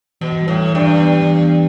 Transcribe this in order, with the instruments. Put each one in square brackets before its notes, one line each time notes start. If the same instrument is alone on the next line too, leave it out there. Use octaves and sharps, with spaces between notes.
[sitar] B2 [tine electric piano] E3
[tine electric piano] G3
[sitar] A2
[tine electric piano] E3
[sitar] G2
[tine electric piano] E3
B3
E3
B3